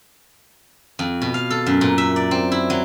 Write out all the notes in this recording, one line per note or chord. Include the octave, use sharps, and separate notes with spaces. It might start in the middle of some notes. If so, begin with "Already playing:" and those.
F2
B2
F5
A4
F#2
A#2
E5
D5
C4
E4
F#3